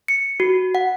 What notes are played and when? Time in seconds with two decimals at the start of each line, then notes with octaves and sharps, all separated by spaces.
0.08 C#7
0.40 F#4
0.75 F#5